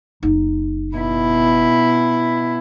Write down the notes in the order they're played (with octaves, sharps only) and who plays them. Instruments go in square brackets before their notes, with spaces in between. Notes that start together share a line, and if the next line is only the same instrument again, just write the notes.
[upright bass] F#1 D#4
[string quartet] B2 E4